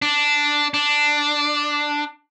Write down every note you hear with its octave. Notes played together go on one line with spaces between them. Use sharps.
D4
D4